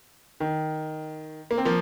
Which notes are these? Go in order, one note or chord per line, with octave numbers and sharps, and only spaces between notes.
D#3
A#3
C4
F3 A#3